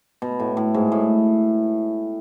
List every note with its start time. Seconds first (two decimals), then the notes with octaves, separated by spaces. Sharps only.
0.22 B2
0.40 A2
0.57 A2
0.74 G#2
0.92 A2